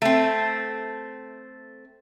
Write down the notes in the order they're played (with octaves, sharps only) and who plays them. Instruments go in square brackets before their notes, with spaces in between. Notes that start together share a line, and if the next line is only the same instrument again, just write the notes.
[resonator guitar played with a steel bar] A3 C4